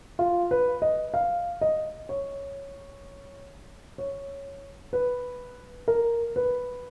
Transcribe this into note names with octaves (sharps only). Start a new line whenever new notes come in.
F4
B4
D#5
F5
D#5
C#5
C#5
B4
A#4
B4